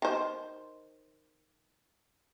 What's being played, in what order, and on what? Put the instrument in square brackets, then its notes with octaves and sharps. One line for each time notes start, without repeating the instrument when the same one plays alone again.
[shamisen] D#3 C5